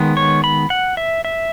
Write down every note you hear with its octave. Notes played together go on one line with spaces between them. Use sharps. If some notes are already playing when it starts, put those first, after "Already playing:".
Already playing: D#3 G#3 B3
C#5
B5
F#5
E5
E5